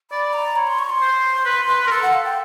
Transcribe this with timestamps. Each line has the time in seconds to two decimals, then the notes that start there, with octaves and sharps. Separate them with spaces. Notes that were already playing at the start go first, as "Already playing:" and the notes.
0.11 D5 B5
0.33 A#5
0.56 C#5 B5
0.67 C6
0.79 C#6
0.89 C6
1.01 C5
1.45 B4
1.68 B4
1.87 A#4
1.91 A4 C6
2.02 F#5
2.14 F5
2.25 G5